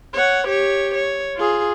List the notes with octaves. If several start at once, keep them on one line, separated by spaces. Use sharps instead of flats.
C#5 F#5
G4 C#5
C#5
F4 G#4